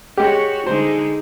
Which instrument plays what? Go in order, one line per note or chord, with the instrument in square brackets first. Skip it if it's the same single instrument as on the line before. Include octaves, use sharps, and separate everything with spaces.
[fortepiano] G#3 G4 [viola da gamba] F#4 C#5
[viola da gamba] D3 G#3 D#4 [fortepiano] C5